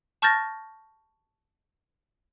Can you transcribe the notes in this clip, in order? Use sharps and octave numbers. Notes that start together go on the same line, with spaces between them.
A5 C#6 F6 G6 A6 A#6